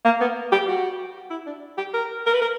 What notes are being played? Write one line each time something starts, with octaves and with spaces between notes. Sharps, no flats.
A#3
B3
G4
F#4
E4
D4
G4
A#4
A#4
B4
A#4